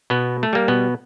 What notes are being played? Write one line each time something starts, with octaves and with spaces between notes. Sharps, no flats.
B2 B3
A3
G3 A#3
B2 B3